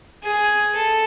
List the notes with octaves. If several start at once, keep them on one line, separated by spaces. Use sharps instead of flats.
G#4
A4